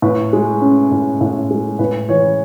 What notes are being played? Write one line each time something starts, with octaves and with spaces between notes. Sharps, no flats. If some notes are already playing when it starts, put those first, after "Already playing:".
A2 B4
G#3
C#4
A2
A2
G#3
A2 B4
E3 C#5